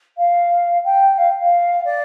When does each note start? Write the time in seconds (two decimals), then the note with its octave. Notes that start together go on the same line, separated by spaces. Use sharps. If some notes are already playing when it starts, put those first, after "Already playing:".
0.18 F5
0.85 G5
1.18 F5
1.40 F5
1.85 D5